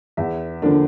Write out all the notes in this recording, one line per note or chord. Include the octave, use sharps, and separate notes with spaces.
E2 E5
D3 F3 A#3 D4